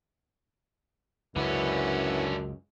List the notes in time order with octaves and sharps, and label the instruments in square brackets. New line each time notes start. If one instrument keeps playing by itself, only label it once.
[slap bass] C#2 [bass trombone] F#2 [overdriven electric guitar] D3 C#4 [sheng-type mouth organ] E4 B4 F#5